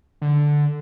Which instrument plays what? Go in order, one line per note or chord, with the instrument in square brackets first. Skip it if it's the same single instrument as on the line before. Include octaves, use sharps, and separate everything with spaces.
[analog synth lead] D3